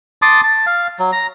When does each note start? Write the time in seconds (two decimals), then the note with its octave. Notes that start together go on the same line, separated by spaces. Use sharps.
0.22 A5 C6 D6 D#6
0.43 A5
0.66 F5
0.99 F#3
1.12 A#5